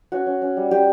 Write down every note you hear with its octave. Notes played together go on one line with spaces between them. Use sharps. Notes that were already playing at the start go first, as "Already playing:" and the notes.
C#4 F#4
C#4
C#4
G3
G3 G4